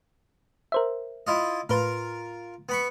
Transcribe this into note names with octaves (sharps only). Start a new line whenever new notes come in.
A#4 C5 E5
E4 F4 D#5
A2 F4 A#4 B4
B3 B5 C#6